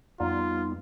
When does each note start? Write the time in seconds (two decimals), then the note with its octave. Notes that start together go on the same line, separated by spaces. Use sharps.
0.20 F2 G3 B3 D#4 F4